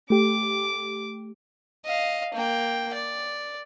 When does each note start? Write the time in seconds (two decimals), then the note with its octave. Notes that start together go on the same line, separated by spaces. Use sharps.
0.10 A3 G4 D6
1.85 D#5 F5
2.34 A#3 G5
2.94 D5